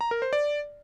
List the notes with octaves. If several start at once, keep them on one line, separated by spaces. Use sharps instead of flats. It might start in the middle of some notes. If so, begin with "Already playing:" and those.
A#5
A#4
C5
D5